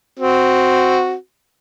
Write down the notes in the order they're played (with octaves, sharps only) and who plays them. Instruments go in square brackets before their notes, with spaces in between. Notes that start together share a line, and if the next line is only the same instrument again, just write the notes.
[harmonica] C4 F#4